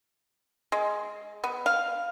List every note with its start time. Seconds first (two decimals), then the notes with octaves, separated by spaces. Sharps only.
0.72 G#3
1.44 B3
1.66 F5